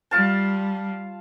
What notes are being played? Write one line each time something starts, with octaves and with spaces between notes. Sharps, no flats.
G3 F4 F5 A5